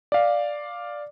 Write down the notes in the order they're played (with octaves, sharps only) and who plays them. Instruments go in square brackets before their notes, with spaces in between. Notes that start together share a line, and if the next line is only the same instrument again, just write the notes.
[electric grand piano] D5 F5